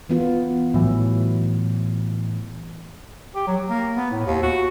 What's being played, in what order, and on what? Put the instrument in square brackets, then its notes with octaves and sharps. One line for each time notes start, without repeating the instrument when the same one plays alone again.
[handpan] E3 B3 F4
[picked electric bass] A2 E3 [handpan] F#3
[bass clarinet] G4
F#3
A#3
B3
A2
D#2
F#4